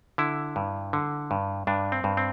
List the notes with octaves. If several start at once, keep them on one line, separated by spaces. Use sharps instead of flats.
D3 E4
G2
D3
G2
G2 D4
C4
G2
C4